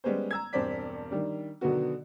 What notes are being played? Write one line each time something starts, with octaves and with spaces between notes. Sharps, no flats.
G3 G#3 B3 C#4 C5
A#5 E6 G#6
E1 G2 C4 C5 D5 B6
D#3 G3 D4
B2 D3 D#3 F#3 B3 F#4